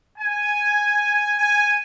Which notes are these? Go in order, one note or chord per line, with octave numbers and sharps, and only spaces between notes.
G#5
G#5